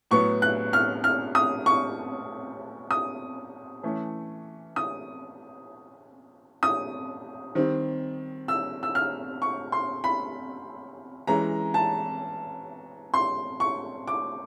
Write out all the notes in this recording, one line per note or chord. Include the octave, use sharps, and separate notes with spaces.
A2 F#3 B3 C#6
F#6
F6
F6
D#6
C#6
D#6
E3 A3 C#4
D#6
D#6
D#3 G3 C4
E6
E6
F6
C#6
C6
B5
E3 G#3 C#4 A#5
A5
C6
C#6
D6